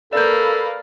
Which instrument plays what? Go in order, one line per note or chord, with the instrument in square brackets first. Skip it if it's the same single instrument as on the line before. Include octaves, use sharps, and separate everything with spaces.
[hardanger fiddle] A#3 B4 [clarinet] A4 [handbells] D5 G6 [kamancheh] F5 B5